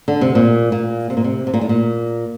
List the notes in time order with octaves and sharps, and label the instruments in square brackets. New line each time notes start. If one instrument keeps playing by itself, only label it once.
[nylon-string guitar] D3
C3
A#2
A#2
C3
A#2
C3
C3
A#2
A2
A#2